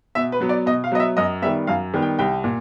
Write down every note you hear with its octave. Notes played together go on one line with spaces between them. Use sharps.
B2 E5
B4
F#3 B3
D5
B2 D#5
F5
F#3 B3 D#5
E5
F#2 D#5
D#3 G3 B3 E5
F#2 F5
D#3 G3 B3
G5
C2 G5
A#2